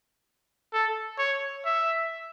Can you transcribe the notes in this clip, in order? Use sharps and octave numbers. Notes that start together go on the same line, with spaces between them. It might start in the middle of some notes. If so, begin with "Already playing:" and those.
A4
C#5
E5